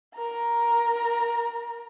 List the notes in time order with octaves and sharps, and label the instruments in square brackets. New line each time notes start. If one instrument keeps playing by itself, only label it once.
[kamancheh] A#4 A#5